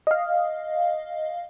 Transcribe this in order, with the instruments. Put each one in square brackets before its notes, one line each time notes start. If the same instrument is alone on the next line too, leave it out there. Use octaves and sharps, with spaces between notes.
[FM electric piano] D#5 F5